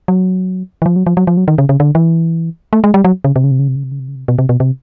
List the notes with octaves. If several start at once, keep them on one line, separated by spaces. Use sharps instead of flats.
F#3
E3
F3
F#3
F3
F#3
F3
F#3
D#3
C#3
C#3
D3
E3
A3
G#3
G3
F#3
C#3
C3
C#3
C3
C#3
C3
C#3
C3
C#3
C3
C#3
C3
B2
C3
B2
C3